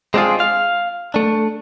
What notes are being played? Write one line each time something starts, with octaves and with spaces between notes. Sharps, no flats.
G#3 C4 D4 D#4 F4 G#4
F5
A3 D4